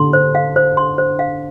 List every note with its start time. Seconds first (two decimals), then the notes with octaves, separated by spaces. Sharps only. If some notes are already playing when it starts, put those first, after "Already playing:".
Already playing: D3 C6
0.13 C5
0.35 F5
0.56 C5
0.77 C6
0.98 C5
1.19 F5